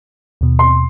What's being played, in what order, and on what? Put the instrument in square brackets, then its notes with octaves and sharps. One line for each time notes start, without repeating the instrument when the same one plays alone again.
[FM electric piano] D#2 B2
[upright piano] C6